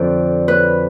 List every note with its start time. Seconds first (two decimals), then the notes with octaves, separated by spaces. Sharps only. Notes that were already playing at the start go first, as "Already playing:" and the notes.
Already playing: F2 D3 F3 D5
0.48 B4